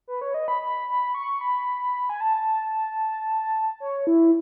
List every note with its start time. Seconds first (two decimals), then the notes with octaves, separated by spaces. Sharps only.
0.08 B4
0.21 C#5
0.34 D#5
0.48 B5
0.61 B5
0.88 B5
1.15 C#6
1.41 B5
2.10 G#5
2.21 A5
3.80 C#5
4.07 E4